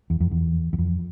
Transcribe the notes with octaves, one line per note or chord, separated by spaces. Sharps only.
E2
F2
E2
E2
F2